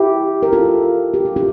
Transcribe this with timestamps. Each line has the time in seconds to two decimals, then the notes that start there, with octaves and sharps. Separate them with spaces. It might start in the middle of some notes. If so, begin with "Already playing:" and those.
Already playing: E4 G4
0.43 A#4
0.53 F4 A4
1.14 G4
1.25 F4
1.36 E4 G4